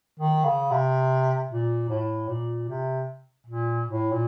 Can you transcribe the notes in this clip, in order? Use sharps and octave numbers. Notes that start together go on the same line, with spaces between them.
D#3
C#3
C3
A#2
A2
A#2
C3
A#2
A2
A#2